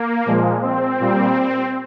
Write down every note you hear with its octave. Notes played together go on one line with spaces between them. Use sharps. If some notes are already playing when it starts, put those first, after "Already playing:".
Already playing: A#3
A#2 F3 G#3
C4
A#2 G3